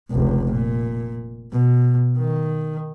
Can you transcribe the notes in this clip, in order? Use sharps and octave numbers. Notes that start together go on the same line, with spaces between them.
F1 C#2
A#2
B2
D#3